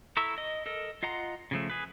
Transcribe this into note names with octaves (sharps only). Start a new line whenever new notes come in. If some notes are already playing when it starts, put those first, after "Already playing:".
E4 A4 A#5 C#6 E6
D#5
A4 A#4 D#5
F4 D#5 F#5 A#5 C6
C#3 F3 A3
G#4 B4